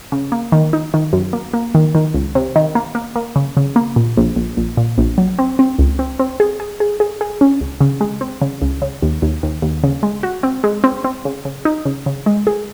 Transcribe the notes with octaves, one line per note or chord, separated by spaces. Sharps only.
C#3
A#3
D#3
D#4
D#3
F#2
A#3
A#3
D#3
D#3
C#2
C3
D#3
A#3
A#3
A#3
C#3
C#3
A#3
A#2
A#1
A#1
A#1
A#2
A#1
F#3
C4
C4
C#2
C4
C4
G#4
G#4
G#4
G#4
G#4
C#4
C#2
C#3
G#3
C4
C#3
C#2
C#3
D#2
D#2
D#2
D#2
C#3
G#3
F#4
C4
G#3
C4
C4
C#3
C#3
D#4
C#3
C#3
G#3
G#4